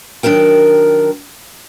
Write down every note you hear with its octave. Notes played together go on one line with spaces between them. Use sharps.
D#3 F#3 D4 A#4 G5